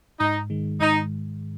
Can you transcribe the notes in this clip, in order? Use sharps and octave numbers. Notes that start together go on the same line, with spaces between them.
G#2 D#4
D#3 G#3
G#2 D#4